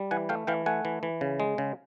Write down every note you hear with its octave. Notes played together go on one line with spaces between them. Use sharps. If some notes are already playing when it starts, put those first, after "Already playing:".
Already playing: G3
E3 F#5 G#5
A3 F5 G5
E3 F5 G5
A3 F#5 G#5
E3
E3
C#3
G#3
C#3